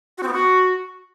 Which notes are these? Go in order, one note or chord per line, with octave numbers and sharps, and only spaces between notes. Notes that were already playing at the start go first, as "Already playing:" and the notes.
F#4
C4
B3
F#4